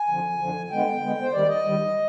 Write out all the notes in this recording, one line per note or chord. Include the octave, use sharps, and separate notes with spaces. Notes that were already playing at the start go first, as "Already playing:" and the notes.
Already playing: G#5
F2 D3 F3
F2 D3 F3
D3 G#3 B3 G5
D3 G#3 B3
C5
D#2 D#3 G3 D5
D#5
D#2 D#3 G3